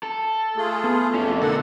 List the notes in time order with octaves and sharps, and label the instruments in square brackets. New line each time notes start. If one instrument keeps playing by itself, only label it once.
[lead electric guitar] A4
[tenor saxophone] A3 [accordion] F4 G#4
[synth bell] B3
[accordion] F2 [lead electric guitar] C#4 E4 [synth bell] F4
[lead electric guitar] B2 D3 [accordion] A4 F#5 [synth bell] A#4